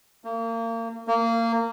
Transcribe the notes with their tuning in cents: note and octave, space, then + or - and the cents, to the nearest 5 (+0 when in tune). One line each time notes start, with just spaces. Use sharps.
A#3 -35
A#3 -20